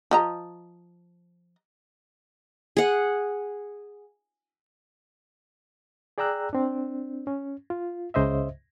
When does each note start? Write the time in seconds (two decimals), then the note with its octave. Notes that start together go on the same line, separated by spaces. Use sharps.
0.11 F3 D#5 A#5
2.77 G#4 F#5
6.18 G#4 D5 G5 A#5 E6 F#6
6.53 C4 D4
7.27 C#4
7.70 F4
8.14 C#2 C#3 C5 D#5 E5